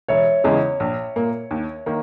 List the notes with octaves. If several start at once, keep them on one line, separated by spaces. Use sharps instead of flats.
E1 C#5 E5
E2 C#3 G#3 D#4
A#1
A#2 A#3
D#2
D#3 A#3